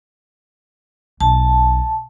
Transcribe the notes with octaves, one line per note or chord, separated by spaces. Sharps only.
B1 A5